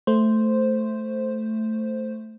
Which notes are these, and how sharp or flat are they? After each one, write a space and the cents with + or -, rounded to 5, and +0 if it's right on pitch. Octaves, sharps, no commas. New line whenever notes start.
A3 +0 C5 +0